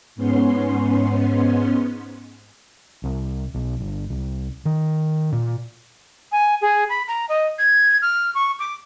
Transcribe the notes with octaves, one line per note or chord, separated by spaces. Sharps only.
G#2 B3 C#4 C6
C2
B1
G1
C2
D#3
A#2
G#5
G#4
B5
A#5
D#5
G#6
F6
C#6
D6